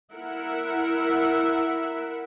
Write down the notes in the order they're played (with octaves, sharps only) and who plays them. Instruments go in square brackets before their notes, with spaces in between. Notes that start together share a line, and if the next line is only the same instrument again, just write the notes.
[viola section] E4 A#4 E5 F#5